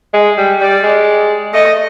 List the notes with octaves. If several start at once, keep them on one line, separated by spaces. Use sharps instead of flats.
G#3
G3
G3 D5
G#3
A3 D#5